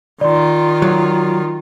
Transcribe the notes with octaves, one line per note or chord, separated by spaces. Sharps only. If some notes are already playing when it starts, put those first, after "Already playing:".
D#3 F4 D5 C6
F#3